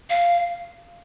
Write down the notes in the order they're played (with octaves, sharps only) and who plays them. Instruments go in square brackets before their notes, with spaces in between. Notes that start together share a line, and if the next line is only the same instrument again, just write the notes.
[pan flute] F5